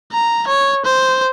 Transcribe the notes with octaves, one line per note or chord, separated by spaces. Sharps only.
A#5
C#5
C5